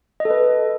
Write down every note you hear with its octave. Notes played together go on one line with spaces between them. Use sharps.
D#5
A4
B4